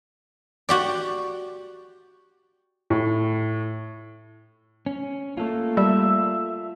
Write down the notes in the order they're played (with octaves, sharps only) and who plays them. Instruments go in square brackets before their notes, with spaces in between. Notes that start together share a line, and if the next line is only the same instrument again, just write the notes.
[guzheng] F#4 G4 D5
[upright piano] A2
[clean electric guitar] C#4
[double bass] A3 A#3 [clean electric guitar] F4 A4
[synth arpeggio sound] G3 [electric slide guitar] E5